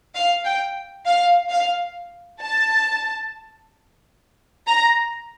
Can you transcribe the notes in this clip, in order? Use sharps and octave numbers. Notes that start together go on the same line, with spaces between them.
F5
G5
F5
F5
A5
A#5